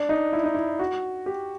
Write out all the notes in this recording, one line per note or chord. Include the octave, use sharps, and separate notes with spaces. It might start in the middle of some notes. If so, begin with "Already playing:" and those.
Already playing: D4
D#4
E4
D#4
E4
F#4
G4